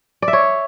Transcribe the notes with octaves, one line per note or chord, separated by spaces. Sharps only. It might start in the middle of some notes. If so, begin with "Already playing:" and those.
D5
E5
C#5